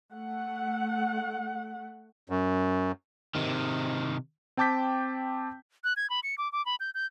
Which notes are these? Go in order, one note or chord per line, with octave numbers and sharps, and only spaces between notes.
A3 F#5
F#2
C3 D#3
C4 G5 A5 D6 G6 B6
F#6
G#6
B5
C#7
D6
D6
B5
G6
G6